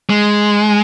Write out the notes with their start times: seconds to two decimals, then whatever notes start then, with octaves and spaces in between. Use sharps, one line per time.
0.10 G#3